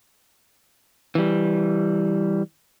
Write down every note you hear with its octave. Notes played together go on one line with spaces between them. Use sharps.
E3 G3